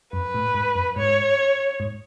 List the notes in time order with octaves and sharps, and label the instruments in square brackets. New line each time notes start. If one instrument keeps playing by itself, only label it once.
[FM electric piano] F#2 [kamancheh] B4
[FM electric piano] A2
G#2
F#2
[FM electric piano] G#2 [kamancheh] C#5
[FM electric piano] G#2